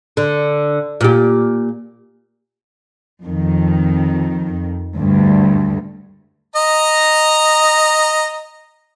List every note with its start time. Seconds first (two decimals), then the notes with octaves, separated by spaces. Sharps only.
0.17 D3
1.01 A#2 G4
3.24 F2 D#3
4.96 D2 G2
6.56 D#5 A#5